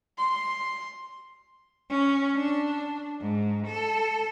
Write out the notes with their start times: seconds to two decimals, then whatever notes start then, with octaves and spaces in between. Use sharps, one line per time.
0.18 C6
1.90 C#4
2.35 D4
3.21 G#2
3.68 A4